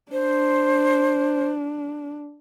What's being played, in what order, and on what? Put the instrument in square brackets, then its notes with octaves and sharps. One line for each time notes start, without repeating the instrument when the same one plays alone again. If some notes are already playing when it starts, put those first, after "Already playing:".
[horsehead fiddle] D4 [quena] C5